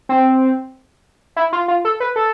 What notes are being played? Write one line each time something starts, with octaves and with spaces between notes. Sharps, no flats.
C4
E4
F4
F4
A4
B4
A4